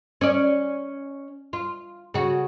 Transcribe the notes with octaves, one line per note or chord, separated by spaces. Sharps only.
C#4 D5
F4
C#3 F#4